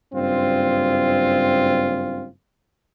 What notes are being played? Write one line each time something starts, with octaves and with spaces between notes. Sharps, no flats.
F#1 G2 C4 F4